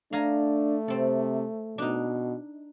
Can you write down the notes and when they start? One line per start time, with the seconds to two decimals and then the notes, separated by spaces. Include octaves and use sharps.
0.13 A3 D4 F5 G#5 A#5
0.88 C3 C4 A4
1.78 B2 D4 D#4